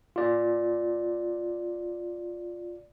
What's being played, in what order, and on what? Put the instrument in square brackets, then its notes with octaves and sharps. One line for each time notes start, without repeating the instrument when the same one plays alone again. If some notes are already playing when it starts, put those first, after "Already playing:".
[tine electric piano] F4 D5